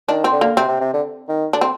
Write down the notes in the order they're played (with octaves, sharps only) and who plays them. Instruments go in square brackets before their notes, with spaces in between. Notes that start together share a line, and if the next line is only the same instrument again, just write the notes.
[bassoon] D#3 [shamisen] D4
[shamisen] C4
[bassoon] D3
[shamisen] A#3
[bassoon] C3 [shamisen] C4
[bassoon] C3
C3
D3
D#3
[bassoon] D3 [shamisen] D4
[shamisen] C4